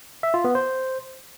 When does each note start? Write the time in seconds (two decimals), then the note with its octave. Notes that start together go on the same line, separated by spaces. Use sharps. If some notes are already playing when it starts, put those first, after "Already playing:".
0.23 E5
0.34 F4
0.44 B3
0.55 C5